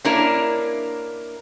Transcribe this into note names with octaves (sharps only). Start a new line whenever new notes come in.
A#3 C#4 D4 E4 A#4